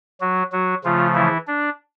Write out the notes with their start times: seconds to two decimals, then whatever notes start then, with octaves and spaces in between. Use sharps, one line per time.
0.21 F#3 F#4
0.52 F#3 F#4
0.84 C#3 F3 A3 F4
1.15 E3 E4
1.47 D4